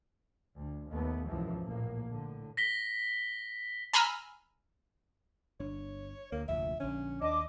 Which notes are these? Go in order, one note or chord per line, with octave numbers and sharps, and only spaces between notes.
D2
D#2 A3 B3
G#1 C#2 F#2 B2 E3 F3
A#1 A2 A#3
A2 D3
A#6 B6 G7
G#5 A#5 B5 E6 F6
G1 D4 C#5
D2 A#3
F1 D2 A#2 E5
A#1 D3 C#4
D#2 D4 D#5 D6